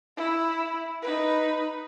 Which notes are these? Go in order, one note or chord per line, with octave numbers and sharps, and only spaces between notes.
E4
D#4 B4